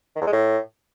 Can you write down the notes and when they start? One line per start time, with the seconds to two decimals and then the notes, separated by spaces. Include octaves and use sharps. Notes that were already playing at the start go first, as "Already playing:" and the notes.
0.16 D#3
0.21 E2
0.27 G#3
0.32 A2